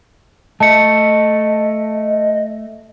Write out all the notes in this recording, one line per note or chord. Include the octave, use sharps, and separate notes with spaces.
A3 D#5 A5 C#7